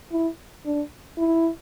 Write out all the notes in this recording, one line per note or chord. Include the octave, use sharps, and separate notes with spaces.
E4
D4
E4